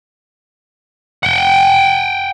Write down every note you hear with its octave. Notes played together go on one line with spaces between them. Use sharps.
F#5 G5